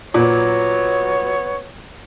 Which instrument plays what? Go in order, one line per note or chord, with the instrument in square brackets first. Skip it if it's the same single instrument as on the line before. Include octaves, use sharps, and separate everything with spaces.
[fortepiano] A#2 [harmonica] F#3 B3 C#5